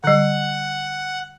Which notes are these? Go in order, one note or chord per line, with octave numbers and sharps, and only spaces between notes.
D3 G3 F#5